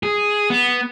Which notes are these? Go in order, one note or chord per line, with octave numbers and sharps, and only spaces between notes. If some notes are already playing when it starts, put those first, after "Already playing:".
G#4
B3